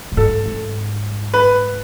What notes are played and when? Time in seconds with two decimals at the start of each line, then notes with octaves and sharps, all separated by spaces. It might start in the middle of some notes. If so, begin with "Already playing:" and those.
0.12 A2
0.17 G#2 A4
0.46 G#2
1.34 B4